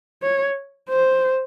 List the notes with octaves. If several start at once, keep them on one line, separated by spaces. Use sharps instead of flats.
C#5
C5